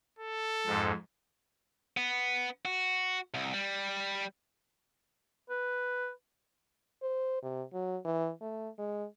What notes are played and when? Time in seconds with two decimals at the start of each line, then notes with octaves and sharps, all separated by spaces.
0.19 A4
0.67 F2 G#2
1.97 B3
2.65 F#4
3.34 C2
3.53 G3
5.50 B4
7.02 C5
7.43 C3
7.73 F#3
8.05 E3
8.41 A3
8.79 G#3